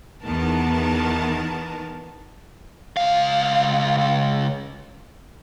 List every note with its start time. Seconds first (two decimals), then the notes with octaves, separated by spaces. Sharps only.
0.24 E2 D#3 B3 A#4 A5
2.97 C#2 F5